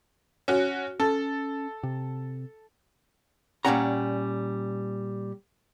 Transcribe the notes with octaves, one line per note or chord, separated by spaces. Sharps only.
C#4 F#4
C#4 A4
C3
A#2 F#3 G3 C#4 F#5 A#5